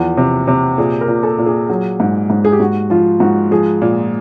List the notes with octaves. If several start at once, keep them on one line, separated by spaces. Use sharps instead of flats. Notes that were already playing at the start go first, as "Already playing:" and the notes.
Already playing: E2 F3
C3
C3
A#2 G#4
A#4
A#2
A4
A#2
G#4
F#3 G#4
G#2
G#2
G#4
G4
G#2 F#4
F3 F4
G#2 F#4
F3 G#4
A#2